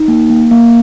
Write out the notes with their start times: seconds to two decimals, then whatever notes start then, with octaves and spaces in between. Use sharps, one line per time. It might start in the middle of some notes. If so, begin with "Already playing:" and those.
Already playing: D#4
0.08 A#3
0.30 A#3
0.51 A#3